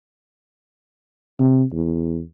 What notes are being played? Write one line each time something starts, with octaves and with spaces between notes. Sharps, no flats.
C3
E2